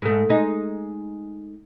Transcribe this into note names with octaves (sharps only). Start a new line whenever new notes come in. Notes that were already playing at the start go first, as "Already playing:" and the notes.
G#2 A3
G#3 D#4